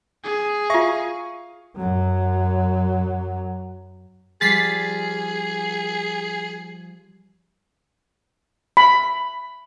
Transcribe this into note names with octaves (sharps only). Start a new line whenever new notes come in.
G#4
F4 E5 F5 C#6
F#2 F#3
F3 G3 G4 G#4 A6 B6 C7
B5